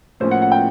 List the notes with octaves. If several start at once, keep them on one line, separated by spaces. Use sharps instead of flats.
A2 F3 A#3 C#4 C5
F#5
F#5
G5